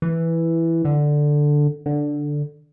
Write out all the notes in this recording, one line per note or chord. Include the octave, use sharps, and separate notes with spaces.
E3
D3
D3